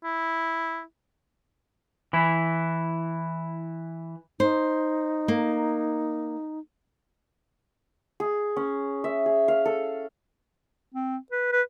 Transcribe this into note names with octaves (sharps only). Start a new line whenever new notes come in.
E4
E3 E4
D#4 C5
A#3
G#4
C#4
E5
G#4
F5
A4
C4
B4
B4